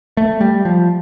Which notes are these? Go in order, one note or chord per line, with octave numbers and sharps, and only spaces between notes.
A3
G3
F3